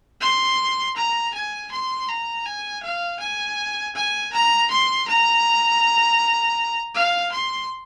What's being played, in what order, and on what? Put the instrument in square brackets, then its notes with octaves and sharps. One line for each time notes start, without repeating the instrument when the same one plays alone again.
[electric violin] C6
A#5
G#5
C6
A#5
G#5
F5
G#5
G#5
A#5
C6
A#5
F5
C6